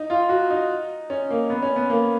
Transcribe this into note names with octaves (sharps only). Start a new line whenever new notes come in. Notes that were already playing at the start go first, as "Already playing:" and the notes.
Already playing: D#4
F4
F#4
D#4
C#4
A#3
B3
C#4
B3
A#3